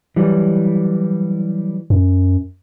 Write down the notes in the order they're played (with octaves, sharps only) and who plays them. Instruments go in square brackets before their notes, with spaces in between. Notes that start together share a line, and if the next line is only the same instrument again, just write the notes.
[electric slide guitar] E3 F#3 G3
[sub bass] F#2